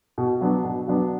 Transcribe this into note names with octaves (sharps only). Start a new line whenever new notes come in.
B2
F#3 B3 D4
B2
F#3 B3 D4